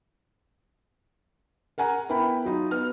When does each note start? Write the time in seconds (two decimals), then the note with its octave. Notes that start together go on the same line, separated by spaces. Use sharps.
1.78 A#4 F#5 G#5 A#5
2.09 B3 E4 A#4 G5 B5
2.45 F#3 D#4 F4
2.71 B3 F6